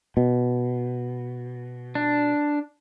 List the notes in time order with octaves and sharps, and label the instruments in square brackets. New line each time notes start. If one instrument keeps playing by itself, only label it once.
[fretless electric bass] B2
[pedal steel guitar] D4